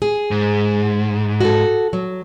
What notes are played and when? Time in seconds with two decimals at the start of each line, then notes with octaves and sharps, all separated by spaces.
0.02 G#4
0.31 G#2
1.40 F#4 A4
1.93 F#3